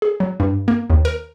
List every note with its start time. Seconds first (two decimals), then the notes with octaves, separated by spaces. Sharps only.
0.02 G#4
0.20 F#3
0.40 G2
0.68 A#3
0.90 D#2
1.05 A#4